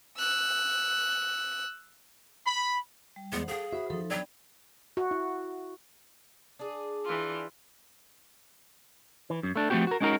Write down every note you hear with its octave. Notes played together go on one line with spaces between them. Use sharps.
E6 F#6
B5
G3
E2 G#3 B3 C5 F#5
G#4 A4 F5 G5
F#4 C5 E5 B5 D#6
F3 D#4 A4
F#3 B3 D4 D5 G5 B5
F#4
E4
D4 G#4
E3 F4
E3
F#2
A3 D4
F3 A3 A#3 C4 F#4 G4
F#4 A#4
G#3 C#4 D#4 F#4 A#4